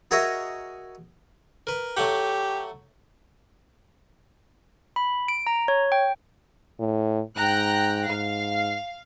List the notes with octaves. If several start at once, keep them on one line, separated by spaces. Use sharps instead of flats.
F#4 G#4 A#4 C#5 D#5 E5
A#4 B4
F#3 A3 G4 F#5
B5
D7
A#5
C#5
G5
A2
G#2 G5 A#5 F#6
G#2 F5